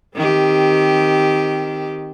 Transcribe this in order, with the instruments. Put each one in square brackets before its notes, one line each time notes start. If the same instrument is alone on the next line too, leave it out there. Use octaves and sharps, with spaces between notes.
[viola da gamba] D#3 C4 G4